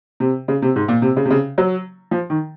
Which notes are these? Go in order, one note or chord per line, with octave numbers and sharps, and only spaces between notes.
C3
C#3
C3
G#2
A#2
C3
C#3
C3
C#3
F#3
F3
D#3